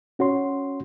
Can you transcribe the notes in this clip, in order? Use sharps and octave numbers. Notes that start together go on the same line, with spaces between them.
C#4 F#4 C#5 C6